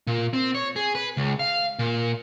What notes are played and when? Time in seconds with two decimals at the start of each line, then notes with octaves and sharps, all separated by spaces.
0.07 A#2
0.33 C4
0.55 C#5
0.76 G#4
0.95 B4
1.17 C#2
1.39 F5
1.79 A#2